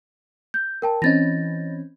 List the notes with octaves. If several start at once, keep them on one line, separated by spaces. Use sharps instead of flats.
G6
A#4 G5 A5
E3 C4 C#4 D#5 A6 A#6